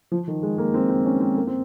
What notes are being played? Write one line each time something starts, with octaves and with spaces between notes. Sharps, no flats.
F3
D#3
G#3
A#3
C4
C4
C#4
C4
A#3
C4